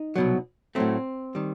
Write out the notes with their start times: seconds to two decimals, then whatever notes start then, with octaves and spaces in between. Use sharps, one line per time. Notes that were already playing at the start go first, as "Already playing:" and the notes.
Already playing: D#4
0.16 C2 B2 F#3
0.75 A2 F#3 A3 C4
1.35 D#3 G3